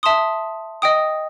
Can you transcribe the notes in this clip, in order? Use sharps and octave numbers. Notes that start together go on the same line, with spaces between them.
E5 A5 C6 D#6
D#5 G5 D#6